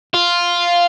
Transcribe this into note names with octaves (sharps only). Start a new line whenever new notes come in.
F4